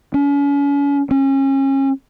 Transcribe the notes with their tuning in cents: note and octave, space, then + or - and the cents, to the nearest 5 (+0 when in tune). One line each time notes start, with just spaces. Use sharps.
C#4 +40
C#4 -30